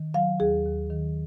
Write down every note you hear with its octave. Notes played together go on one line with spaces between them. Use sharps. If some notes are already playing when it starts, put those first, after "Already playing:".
Already playing: D#3
F#3 F5
D#2 G#4
D#2
D#3